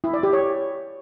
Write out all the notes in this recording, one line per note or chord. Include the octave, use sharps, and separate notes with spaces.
E4
D5
G4
C#5